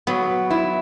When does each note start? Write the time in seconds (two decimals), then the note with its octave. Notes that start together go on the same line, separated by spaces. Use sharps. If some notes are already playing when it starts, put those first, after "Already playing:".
0.07 F#3 B3
0.50 E4